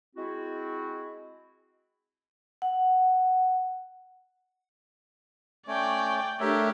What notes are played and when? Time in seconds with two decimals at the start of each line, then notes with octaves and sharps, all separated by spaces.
0.16 G#3 C4 E4 F#4
2.62 F#5
5.68 A3 C#4 C#5 D5 G5
6.40 A3 D4 G4 A#4 C#5 E5